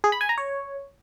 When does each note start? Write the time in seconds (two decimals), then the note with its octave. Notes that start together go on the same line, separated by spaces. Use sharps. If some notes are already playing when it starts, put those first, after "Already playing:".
0.04 G#4
0.12 B5
0.21 G#5
0.29 A#5
0.38 C#5